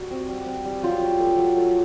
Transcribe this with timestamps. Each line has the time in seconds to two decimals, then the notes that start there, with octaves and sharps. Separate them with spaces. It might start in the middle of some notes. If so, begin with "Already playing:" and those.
Already playing: G3 F#4
0.10 C4
0.28 G3
0.46 C4
0.65 G3
0.83 F#3 F4 G4
1.01 F#3
1.19 A3
1.38 F#3
1.57 A3